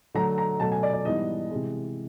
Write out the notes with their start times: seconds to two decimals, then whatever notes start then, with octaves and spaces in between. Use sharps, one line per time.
0.14 D3 F#3 A3 A#5
0.38 A#5
0.60 B2 F#3 A3 A5
0.72 G#5
0.83 D5
0.93 D5
1.05 G#2 E3 G3 B3 D#5
1.50 C3 E3 G#3